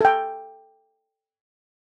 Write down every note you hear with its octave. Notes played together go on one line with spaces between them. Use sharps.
A4 G5